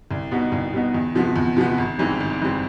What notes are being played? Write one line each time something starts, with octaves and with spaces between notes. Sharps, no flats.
C2
B2 G3 B3 D#4
C2
B2 G3 B3 D#4
E2
C3 F3 G#3 B3
E2
C3 F3 G#3 B3
G#1
G#2 E3 G3 C4
G#1
G#2 E3 G3 C4